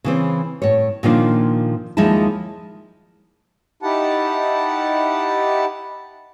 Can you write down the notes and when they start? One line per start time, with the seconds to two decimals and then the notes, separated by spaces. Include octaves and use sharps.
0.04 C#3 E3 C4
0.62 A2 C#5
1.03 A#2 D#3 F3 A#3 D4 F4
1.97 D#2 F3 G#3 D#4 E4 A5
3.83 D#4 E4 G4 F#5 A5